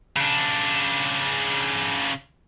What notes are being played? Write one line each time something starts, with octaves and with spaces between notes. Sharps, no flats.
C#3 D4